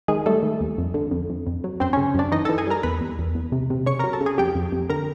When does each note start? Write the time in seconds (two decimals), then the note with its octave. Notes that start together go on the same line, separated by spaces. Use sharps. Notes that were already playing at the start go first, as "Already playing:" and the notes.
0.08 D#3 G#3 G#4
0.26 G3 A3 A4
0.43 D#3
0.61 D#2
0.78 F2
0.94 D3
1.11 F2
1.30 F2
1.47 F2
1.64 F#3
1.80 F#2 C4 C5
1.93 C#4 C#5
1.97 C#3
2.15 F#2 D4 D5
2.32 E3 D#4 D#5
2.45 A4 A5
2.49 E3
2.58 G#4 G#5
2.67 G3 A#4 A#5
2.83 E2 B4 B5
3.01 E2
3.19 E2
3.35 E2
3.52 C3
3.70 C3
3.86 C#3 C#5 C#6
3.99 A#4 A#5
4.04 F#3
4.13 A4 A5
4.21 C#3
4.26 G#4 G#5
4.38 F2 G4 G5
4.55 F2
4.72 F2
4.90 D3 A#4 A#5